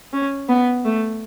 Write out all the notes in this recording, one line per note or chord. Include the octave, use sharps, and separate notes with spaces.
C#4
B3
A3